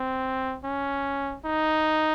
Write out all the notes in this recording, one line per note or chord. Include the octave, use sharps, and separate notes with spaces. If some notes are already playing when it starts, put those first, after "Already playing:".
Already playing: C4
C#4
D#4